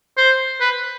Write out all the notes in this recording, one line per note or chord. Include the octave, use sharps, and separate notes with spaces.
C5
B4